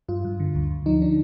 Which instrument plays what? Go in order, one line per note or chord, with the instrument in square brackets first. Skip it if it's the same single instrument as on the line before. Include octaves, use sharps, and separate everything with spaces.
[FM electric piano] G2 F4
G2
D3
D2
D2
F3 D#4
D3 D4